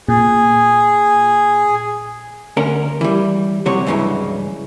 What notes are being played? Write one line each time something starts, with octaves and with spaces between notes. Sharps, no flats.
A#2 G#4
D2 C#4 A#4
E3 G3
C2 C3 F#3 C#5
C#2 G2 C#3 E3 F#3